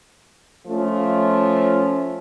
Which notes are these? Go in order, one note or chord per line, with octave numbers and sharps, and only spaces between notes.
F3 A3 C#4 F4